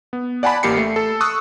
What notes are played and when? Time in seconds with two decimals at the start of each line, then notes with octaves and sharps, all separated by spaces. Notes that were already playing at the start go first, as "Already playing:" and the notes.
0.13 B3
0.43 D5 F#5 G#5 A5 B5
0.63 A1 A#3 G4 B5 C7 C#7
0.77 A3
0.96 A4
1.21 C#6 D#6 E6 F#6